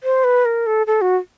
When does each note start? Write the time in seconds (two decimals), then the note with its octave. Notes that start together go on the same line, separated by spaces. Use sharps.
0.03 C5
0.24 B4
0.45 A#4
0.67 A4
0.87 A4
1.01 F#4